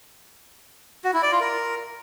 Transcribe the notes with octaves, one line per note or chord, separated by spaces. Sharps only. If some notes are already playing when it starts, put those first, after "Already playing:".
F#4
E4
D5
F4
A#4